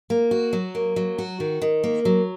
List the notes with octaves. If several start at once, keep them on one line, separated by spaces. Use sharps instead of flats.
A#3
F#4
F#3
A#3
F#3
F#4
D#3
D#3
A#3
F#3